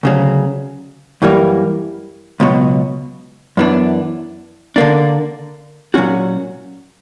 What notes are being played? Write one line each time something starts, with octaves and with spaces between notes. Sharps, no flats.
D2 C#3 F#3
F#2 E3 G3 A#3
C#2 B2 F#3
F#2 E3 B3 D4
D3 A#3 D4
A#2 F#3 C#4 F#4